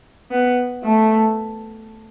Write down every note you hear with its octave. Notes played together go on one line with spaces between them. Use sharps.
B3
A3